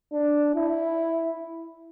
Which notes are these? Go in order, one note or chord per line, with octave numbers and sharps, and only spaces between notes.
D4
E4